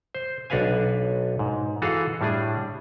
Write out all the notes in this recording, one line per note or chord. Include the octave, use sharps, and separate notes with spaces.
C5
B1 D4 F#4 B4 F5 G#5
G#2
E3 F#4 G#4 A4 F5
A2 G3 D4 G#4